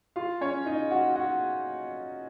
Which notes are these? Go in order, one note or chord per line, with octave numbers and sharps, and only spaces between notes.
F4 F5
C#4 C#5
D#4 D#5
F#4 F#5
F#4 F#5